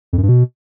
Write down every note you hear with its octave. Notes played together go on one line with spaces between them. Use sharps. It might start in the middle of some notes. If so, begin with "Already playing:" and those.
F2
F#2
G2
B2